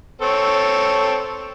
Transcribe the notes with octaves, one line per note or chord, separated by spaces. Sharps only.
C4 A4 C#5